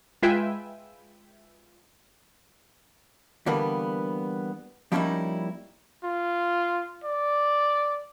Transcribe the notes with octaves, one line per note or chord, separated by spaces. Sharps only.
G#3 F4 B4 E5 G5 G#5
D3 E3 G3 A#3 B3
F3 G3 A#3 C#4 D#4 E4
F4
D5